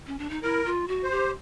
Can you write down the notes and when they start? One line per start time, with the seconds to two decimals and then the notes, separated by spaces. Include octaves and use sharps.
0.07 C#4
0.19 D4
0.30 D#4
0.42 E4 A#4
0.65 F4
0.88 F#4
1.04 C5
1.11 G4